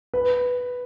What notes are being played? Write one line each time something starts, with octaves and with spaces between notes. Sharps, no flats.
B4